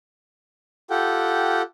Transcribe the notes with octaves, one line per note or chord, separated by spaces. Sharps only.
F4 G4 A4 F#5 G5